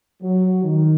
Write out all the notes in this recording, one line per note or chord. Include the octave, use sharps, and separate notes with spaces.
F#3
D#3